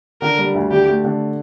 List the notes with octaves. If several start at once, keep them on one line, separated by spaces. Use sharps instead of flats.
D3 A#4
G3
D2
D3 G4
A3
D3